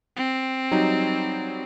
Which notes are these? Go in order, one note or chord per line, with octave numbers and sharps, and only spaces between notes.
C4
F#3 G3 D#4